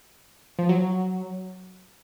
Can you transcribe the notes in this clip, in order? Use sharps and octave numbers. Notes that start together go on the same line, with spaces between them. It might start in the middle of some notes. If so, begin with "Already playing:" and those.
F3
F#3